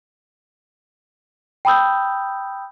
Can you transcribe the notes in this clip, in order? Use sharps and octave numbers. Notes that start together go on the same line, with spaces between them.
G5 A5 B5 D#6 E6 G6